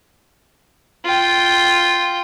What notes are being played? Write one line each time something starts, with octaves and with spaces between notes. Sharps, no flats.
F4 G5